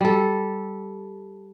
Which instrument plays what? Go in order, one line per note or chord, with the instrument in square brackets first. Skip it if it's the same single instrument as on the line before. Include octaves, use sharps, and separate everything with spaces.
[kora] G3 A4